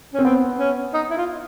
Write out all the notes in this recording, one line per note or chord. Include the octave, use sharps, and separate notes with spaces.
C4 C#4
B3 C4
C#4
D#4
E4
F4